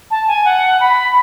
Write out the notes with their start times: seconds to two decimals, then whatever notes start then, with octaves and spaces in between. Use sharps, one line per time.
0.11 A5
0.28 G#5
0.45 F#5
0.80 B5